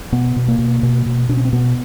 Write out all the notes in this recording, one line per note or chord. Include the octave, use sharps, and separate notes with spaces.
B2 B3
B2
A#3
B2
B2
B2
B2 D4
C#4
C4
B2 B3